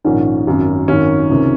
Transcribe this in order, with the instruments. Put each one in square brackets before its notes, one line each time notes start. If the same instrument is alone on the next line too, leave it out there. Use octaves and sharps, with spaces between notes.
[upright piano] A#1 G#2 D#3 C#4
G#1 F#2 D#3
G#1 F#2 D#3 C#4
C#2 C3 D#3